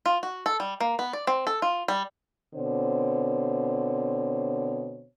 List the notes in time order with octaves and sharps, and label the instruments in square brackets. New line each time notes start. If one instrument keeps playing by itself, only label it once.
[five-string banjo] F4
F#4
A4
G3
A#3
B3
D5
C4
A4
F4
G3
[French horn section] B2 D3 C4 C5 C#5